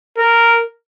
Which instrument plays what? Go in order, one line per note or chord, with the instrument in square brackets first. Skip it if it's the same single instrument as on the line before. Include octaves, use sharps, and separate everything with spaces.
[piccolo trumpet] A#4